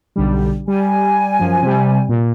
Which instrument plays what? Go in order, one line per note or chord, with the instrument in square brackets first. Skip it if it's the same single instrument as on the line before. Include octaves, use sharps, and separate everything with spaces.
[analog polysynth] B1 D3 G3
[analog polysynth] G3 [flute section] G#5
[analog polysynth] F#2 F3
C3 G3
A#2